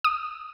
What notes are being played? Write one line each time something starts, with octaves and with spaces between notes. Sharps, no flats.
D#6